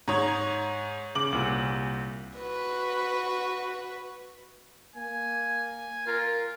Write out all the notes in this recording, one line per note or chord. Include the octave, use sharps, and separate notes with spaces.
G#2 C#5 A#5 D#6 G#6
C#3 D6 F#7
C2 A#2
F#4 B4
A#3 G#5
F4 A#4